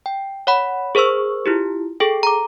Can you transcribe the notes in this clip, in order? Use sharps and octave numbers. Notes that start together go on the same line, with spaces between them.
G5
C#5 F#5 B5
G#4 A#4 C5 C#6 E6
E4 F4 G4
G#4 A4 G5
A#5 D6